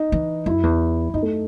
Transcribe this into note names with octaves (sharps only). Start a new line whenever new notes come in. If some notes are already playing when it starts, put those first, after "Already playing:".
Already playing: D#4
E3
F#2 E4
E2
F#2 D#4
A3